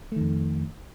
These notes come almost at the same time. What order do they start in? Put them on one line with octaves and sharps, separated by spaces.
A3 D#3 F2